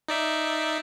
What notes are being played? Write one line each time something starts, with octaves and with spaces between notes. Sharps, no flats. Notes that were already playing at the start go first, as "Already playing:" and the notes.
D#4 D5 E5